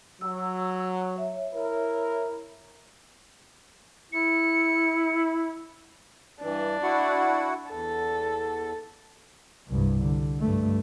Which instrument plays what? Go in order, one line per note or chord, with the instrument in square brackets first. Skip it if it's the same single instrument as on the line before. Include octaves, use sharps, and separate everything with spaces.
[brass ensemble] F#3 [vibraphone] E6
[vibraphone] C#5 E5
[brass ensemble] E4 A#4
[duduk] E4 [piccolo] C#7
[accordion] G2 E3 [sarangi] D4
[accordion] E4 F#4 F#5
[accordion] E2 [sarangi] A4
[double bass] C2 G2
D3
G2 A3